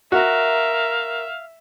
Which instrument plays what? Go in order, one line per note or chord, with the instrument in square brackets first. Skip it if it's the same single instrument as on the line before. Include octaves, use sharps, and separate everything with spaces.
[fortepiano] F#4 [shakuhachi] A#4 [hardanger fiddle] E5 [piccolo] F5